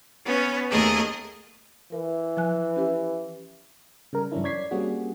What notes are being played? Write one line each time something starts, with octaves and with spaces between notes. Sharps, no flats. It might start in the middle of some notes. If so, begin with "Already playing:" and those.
B3 C#4
D#2 A3 G#4 A#4 D#5
E3 A#4
F3 G#5 F#6
C#4 G4 B4
C#3 G3 A#4
G2 E3 F#3 C#4 D4 E4
C#5 D5 G#6 B6 C7
G3 A#3 C4 C#4 F#4 G#4